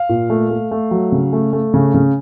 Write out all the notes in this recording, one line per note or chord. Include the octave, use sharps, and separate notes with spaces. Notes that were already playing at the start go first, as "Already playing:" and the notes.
Already playing: F5
A#2
A3
A3
A3
F#3
C#3
A3
A3
C#3
C#3